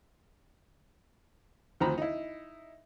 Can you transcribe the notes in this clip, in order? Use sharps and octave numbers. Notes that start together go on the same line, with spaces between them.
D2 D#3 F3 C4 A#5 B5
D#4 E4